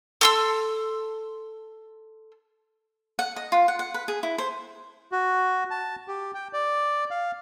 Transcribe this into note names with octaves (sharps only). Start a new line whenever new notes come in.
A4 C6 E6
F#5
D#5
F4
F#5
F#5
B4
G#4
E4
C5
F#4
A5
G4
G5
D5
F5